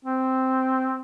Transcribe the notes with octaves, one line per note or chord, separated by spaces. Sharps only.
C4